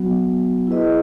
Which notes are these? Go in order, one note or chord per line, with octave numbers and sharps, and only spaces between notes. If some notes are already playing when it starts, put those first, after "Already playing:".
Already playing: F#3 B3 F#4
E4 G#4 B4 D#5